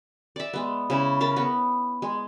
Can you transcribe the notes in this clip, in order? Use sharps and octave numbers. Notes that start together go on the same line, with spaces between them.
D5 E5
G#3 B3
C#3 E4
A#4 A5 B5
B3
G#3